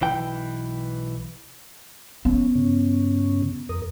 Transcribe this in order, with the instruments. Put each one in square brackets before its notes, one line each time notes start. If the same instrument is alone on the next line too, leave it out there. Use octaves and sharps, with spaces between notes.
[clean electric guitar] B1 E3 G5
[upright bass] B3 [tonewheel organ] C#4
[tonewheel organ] G2 C#3 C#4
F2 A#4 D#6